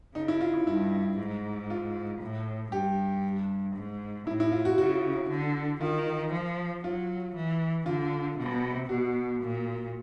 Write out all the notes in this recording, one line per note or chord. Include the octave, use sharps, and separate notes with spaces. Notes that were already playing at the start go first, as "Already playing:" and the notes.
C#3 D#4
E4
F4
E4
G2 E4
G#2
F4
A2
G2 G4
G#2
A2 E4
E4
F4
F#4
C#3 F#4
D3
D#3 F4
F3
F#3 F4
E3
D3 F4
C3
B2 F#4
A#2